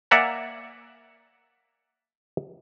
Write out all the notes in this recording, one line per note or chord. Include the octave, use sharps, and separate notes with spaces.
A#3 D5 E5 F#5 G#5 A#5